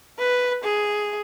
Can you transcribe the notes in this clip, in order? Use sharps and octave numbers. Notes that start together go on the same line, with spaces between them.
B4
G#4